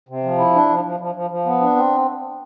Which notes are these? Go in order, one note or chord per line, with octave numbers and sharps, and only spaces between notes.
C3
F3
E4
D4
F3
F3
F3
F3
F3
B3
D4
C4